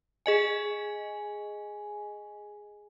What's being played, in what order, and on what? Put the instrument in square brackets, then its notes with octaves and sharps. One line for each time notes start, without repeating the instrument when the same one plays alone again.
[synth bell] G#4 D#5 G#5